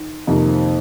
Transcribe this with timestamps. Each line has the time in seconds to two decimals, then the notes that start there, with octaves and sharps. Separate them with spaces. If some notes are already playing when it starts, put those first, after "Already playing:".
Already playing: D#3
0.27 F2 C3 D#3 A#3